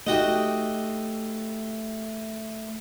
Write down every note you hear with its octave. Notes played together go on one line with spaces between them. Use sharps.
A3 D#4 F#4 G4